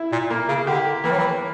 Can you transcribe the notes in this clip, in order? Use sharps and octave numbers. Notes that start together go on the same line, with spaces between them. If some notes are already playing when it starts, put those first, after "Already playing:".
Already playing: E4
A#2
A#3
C#3
D3 G4
E3 A#3
F#3
E3